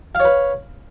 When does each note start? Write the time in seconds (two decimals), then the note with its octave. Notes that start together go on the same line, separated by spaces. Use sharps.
0.15 F5
0.20 C#5
0.25 B4